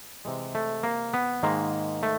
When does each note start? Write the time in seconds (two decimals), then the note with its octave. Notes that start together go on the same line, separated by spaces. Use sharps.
0.25 C3 E3 G#3
0.55 A3
0.83 A#3
1.14 B3
1.43 G#2 D#3 G#3 A#3
2.03 A3